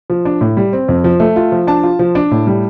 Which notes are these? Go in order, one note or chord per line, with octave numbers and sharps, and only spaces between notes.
F3
D4
A2
G3
C4
F2
F3
A3
F4
F3
D4 A5
F4
F3
D4
A2
G3